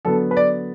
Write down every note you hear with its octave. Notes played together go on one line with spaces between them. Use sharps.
D3 F#3 B3 A4
B4
D5